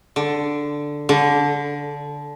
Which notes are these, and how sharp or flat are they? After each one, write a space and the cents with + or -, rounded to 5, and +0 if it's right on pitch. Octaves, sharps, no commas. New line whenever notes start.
D3 +0
D3 -20